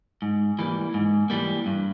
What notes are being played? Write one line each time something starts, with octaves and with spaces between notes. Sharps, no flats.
G#2
E3 G3 A#3
G#2
E3 G3 A#3
G2